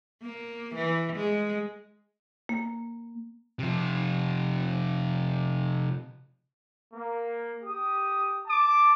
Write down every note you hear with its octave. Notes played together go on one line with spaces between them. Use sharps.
A#3
E3
G#3
A#3
C3 F3
A#3
G4 D#6
A5 D6